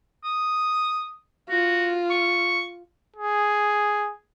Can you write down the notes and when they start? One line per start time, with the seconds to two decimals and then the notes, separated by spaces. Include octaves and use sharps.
0.24 D#6
1.50 F4 F#4
2.11 C#6
3.17 G#4